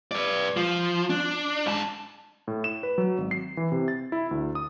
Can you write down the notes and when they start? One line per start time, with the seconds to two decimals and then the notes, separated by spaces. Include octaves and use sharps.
0.11 B4 D5
0.57 F3
1.10 D4
1.66 G#2 A5
2.48 A2
2.64 E7
2.83 B4
2.98 F#3
3.18 G#1
3.31 C7
3.57 E3
3.72 C3
3.88 A6
4.12 E4
4.31 D2
4.55 D#6